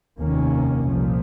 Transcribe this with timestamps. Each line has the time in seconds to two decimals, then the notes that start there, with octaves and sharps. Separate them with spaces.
0.19 F1 D#2 D#3 A#3 C#4
0.88 C2 A#2 F3